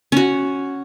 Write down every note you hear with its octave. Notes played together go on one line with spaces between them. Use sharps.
C#4 F#4